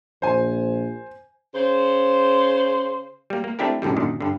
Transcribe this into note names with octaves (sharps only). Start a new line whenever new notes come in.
A#1 C5 G#5
C#3 C5
G3 A#3
A#3
A3 C4 D4 E4 G4 A#4
B1 F#2 A2 D3 G3
F#2 A#2 D3 D#3
G2 D3